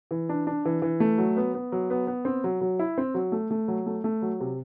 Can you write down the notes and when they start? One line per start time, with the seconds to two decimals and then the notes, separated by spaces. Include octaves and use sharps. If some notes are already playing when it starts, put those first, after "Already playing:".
0.11 E3
0.29 D4
0.47 D4
0.65 E3
0.82 E3
1.00 A3
1.18 F#3
1.37 B3
1.54 B3
1.72 F#3
1.90 B3
2.07 B3
2.25 C4
2.44 F#3
2.61 F#3
2.79 E4
2.98 C4
3.14 F#3
3.32 A3
3.51 A3
3.68 F#3
3.86 A3
4.04 A3
4.22 F#3
4.40 C3